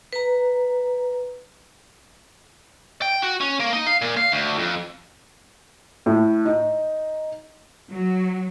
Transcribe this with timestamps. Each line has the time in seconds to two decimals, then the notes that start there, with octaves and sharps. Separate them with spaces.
0.13 B4 A#5
3.02 G5
3.22 F#4
3.41 C#4
3.60 A#3
3.73 D#4
3.87 F5
4.02 A#2
4.17 F5
4.32 D2
4.59 F2
6.06 A2
6.45 D#4
7.92 F#3